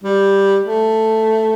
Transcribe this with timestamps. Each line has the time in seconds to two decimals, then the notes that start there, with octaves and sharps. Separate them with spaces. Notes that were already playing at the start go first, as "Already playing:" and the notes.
0.04 G3
0.64 A3